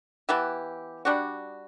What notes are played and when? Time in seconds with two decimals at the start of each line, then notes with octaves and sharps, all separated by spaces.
0.29 E3 B3 E4 G4
1.05 G3 D4 F#4